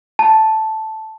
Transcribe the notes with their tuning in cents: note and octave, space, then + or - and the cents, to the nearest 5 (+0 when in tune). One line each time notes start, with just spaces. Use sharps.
A5 -5